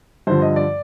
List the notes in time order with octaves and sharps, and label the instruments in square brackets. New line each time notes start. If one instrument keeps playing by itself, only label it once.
[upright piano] G2 D3 F3 C5
D#5
D5